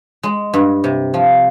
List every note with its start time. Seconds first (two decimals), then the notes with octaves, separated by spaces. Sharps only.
0.23 G#3
0.54 G2
0.84 C3
1.14 F3